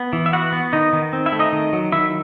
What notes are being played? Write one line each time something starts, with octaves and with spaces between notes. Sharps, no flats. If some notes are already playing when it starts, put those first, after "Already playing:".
Already playing: B3
E3
E5
B3 F#4 F#5
B3
D#3 D#4 D#5
D#3
C4
E4 E5
A3
D#4 D#5
D#3
F#3
D#3 E4 E5